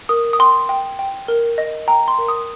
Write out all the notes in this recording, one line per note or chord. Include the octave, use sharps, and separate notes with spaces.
A#4 D#6
D#6
G5 C6
G5
G5
A#4
D#5
G5 A#5
C6
A#4
D#6